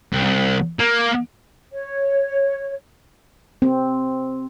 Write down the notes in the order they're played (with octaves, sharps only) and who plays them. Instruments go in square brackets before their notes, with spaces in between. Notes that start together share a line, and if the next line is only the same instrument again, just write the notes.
[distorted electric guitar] C2
A#3
[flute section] C#5
[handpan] C4